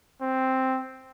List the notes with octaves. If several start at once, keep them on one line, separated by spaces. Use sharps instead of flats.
C4